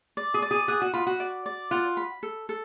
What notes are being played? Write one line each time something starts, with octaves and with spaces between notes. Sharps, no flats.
D5
G#4
D5
G#4
G#4 F#5
F#4
F4 B5
F#4
D5
D5
F4 F#5
B5
A4
A4